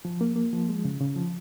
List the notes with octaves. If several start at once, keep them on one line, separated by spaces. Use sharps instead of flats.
F3
A#3
A#3
F3
G#3
C#3
C#3
F3